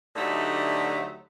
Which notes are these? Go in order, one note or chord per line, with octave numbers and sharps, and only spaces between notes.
D2 D3 F#3 A3 D#4 G4